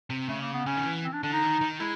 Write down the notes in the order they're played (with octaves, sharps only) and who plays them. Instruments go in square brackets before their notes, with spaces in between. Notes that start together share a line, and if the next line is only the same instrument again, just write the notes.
[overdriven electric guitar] C3
[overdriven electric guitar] C#3 [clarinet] A3
[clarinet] A#3
B3
[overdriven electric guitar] C#3 [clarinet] C#4
[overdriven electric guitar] D#3
E3
[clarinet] C4
D4
[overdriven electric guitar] D3 [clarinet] D4
[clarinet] D#4
[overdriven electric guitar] D#3
D#3
[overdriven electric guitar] G#3 [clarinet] E4